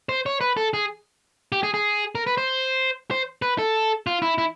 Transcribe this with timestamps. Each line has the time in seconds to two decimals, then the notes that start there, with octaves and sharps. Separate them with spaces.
0.09 C5
0.26 C#5
0.41 B4
0.57 A4
0.74 G#4
1.52 G4
1.63 G#4
1.74 G#4
2.15 A#4
2.27 B4
2.37 C5
3.11 C5
3.42 B4
3.58 A4
4.07 F4
4.22 E4
4.38 E4